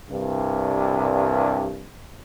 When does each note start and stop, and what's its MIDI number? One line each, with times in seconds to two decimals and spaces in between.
0.10 1.87 36
0.10 1.87 43